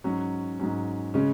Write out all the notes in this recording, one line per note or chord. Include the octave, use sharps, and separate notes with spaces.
G#2 F#3 C#4
G#2 F#3 C#4
C#3 G#3 C#4